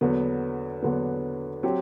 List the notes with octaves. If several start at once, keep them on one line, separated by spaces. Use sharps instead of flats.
E2 D3 F#3 B3
E2 D3 F#3 B3
F#3 C4 G4